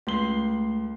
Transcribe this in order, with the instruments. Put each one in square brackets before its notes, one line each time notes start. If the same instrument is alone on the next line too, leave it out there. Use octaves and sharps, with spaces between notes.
[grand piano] C#2 C6 G7 [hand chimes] A3 C7